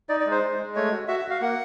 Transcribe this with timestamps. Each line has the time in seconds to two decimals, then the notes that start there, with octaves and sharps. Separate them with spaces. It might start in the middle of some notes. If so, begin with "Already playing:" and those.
0.09 D#4 D5
0.20 D5
0.26 G#3
0.31 C5
0.43 G#3
0.59 G#3
0.75 A3 C#5
0.92 F#4
1.08 F#4 E5
1.19 E5
1.25 F#4
1.30 F5
1.41 A#3 F#5